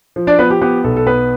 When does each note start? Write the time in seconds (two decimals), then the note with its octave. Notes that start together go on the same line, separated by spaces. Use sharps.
0.16 F3
0.27 D4 D5
0.39 F3 B3 B4
0.50 G4
0.61 B3 G4
0.84 B1 A4
0.97 A4
1.07 B3 B4